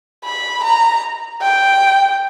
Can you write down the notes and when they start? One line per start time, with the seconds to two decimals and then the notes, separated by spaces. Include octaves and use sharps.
0.25 B5
0.64 A#5
1.42 G5